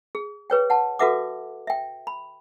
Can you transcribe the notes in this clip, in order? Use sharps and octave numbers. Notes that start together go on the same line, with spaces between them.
G#4
G#4 B4 C#5 G5
F#5 A5
F#4 A4 B4 E5 F#5 D6
E5 G5
B5